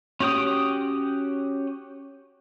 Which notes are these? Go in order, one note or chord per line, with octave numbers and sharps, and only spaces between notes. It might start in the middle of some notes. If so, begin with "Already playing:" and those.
C#4 F#4 G4 G5 D#6